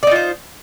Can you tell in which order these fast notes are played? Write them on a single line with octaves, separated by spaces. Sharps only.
D5 D#4 F4 C5